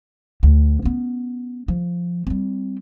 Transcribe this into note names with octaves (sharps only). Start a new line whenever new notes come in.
D2
B3 C#4
F3
G3 C4